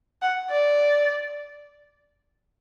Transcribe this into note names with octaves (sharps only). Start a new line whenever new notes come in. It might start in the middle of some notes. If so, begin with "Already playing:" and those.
F#5
D5